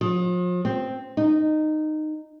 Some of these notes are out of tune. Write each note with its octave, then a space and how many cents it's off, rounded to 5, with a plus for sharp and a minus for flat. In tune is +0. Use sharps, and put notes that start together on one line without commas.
F3 +40
C4 +0
D#4 -15